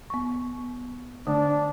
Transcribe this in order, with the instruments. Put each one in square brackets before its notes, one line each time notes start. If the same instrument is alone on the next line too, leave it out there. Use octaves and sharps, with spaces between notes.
[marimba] B3 C#6
[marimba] D3 A3 [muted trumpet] D4